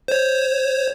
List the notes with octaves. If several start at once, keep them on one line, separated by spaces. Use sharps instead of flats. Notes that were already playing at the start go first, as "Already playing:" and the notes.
C5 C#5